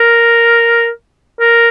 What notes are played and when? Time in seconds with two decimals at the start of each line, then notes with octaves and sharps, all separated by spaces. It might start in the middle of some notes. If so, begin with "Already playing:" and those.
Already playing: A#4
1.40 A#4